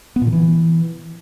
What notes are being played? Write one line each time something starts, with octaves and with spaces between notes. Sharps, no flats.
B3
A#2
D#3
E3